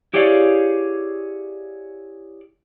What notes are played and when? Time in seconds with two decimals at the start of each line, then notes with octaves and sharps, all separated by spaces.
0.14 E4 G4 G#4 C#5 D5 F5